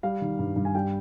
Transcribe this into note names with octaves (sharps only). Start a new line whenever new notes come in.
G3 F5
D#3
G2
G2
G#5
G3 G5